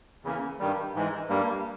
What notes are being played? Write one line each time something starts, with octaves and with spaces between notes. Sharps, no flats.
E2 C#3 E3 A#3 C#4
G2 D#3 G3
G#2 E3 G#3
G2 G3 A#3